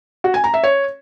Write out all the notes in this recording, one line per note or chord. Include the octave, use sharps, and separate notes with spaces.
F#4
G#5
A#5
E5
C#5